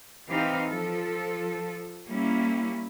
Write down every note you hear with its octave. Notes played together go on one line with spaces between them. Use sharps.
E3 C4 D#4 G4 F5
F3 A4
G3 A#3 C#4 E4